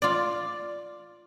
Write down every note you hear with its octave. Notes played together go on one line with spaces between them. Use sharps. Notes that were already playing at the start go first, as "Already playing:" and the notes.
F4 D5